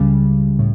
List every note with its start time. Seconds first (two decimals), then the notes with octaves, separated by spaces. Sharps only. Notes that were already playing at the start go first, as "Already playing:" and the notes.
Already playing: C#2 C#3 G3
0.59 A2